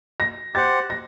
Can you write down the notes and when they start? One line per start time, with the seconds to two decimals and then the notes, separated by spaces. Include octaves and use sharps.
0.20 A#6
0.54 G4 C5 F#5 A6
0.90 A#6